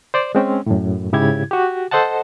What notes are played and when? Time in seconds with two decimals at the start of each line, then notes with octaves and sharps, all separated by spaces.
0.14 C5 D5
0.35 G#3 C4 C#4
0.66 F#2 A2
1.13 G#2 C#3 E4 G4 G#6
1.51 F#4 G4
1.91 A4 C5 D#5 F#5 A5